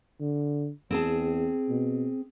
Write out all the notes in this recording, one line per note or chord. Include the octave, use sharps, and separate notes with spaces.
D3
E2 C4 G#4 A5
B2